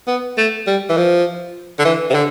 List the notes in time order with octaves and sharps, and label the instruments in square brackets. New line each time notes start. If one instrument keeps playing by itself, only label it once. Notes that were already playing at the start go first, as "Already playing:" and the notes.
[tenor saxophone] B3
A3
G3
E3
F3
D3
E3
C3
D3